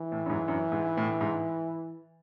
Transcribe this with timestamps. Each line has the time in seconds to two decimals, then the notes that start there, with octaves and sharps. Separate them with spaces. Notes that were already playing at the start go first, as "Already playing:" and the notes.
Already playing: E3
0.12 A2
0.26 F#2
0.30 G#2
0.48 F#2
0.72 G#2
0.97 A2
1.21 G#2